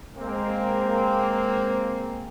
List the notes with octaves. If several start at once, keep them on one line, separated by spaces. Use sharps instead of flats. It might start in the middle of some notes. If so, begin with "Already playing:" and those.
G#3 A#3 C4